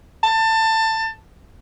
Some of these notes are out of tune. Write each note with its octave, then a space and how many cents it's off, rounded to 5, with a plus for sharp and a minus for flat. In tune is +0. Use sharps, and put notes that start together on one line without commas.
A5 +20